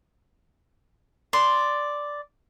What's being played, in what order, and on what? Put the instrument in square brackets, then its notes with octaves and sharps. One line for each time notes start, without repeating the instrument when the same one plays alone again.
[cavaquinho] D5 C6